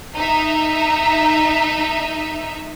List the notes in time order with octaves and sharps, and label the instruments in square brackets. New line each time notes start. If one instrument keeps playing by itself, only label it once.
[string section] D#4 E5 [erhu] A#5